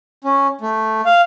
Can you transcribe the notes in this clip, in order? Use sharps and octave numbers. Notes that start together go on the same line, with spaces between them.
C#4
A3
F5